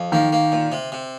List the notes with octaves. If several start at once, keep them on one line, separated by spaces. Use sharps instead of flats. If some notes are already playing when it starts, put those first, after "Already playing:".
Already playing: F2
D#3 A#3
A#3
A#2
C3
C3